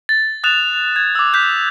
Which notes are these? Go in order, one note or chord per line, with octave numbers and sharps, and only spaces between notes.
A6
D#6 F#6 A6 E7 F7
G#6
D6 E6
F#6 G6 B6